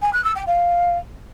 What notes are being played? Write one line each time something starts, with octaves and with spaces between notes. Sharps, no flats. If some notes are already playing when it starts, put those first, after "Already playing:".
G#5
F#6
E6
G5
F5